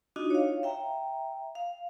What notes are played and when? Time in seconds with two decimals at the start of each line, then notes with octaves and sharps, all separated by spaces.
0.16 D4 D#4 F4 F#4 D#5
0.30 C#5 F5
0.63 E5 G5 A#5
1.55 F5